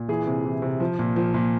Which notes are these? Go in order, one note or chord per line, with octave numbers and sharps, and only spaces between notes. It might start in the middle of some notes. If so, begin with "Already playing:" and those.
Already playing: A#2
E3 G#4
C3
E3
C3
F3
A#2
F3
A#2